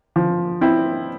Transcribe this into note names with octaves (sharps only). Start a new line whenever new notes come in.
F3
C4 E4